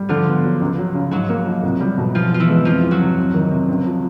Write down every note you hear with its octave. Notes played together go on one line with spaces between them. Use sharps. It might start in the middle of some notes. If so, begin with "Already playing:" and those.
Already playing: G3
D3 F3 F4
B3
F#3
C#2
F#3
C#3
G#2 F#3 F#4
A#3
F3
C2
G3
B2
E3 F3 F4
B3 F4
E3 E4
G#3
F2 F3 F4
E3
F#3 F#4
C3
F2
D#3
C3
C#2
F3